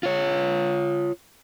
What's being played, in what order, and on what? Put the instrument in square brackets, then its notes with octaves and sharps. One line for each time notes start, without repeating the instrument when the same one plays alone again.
[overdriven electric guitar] F4 C#5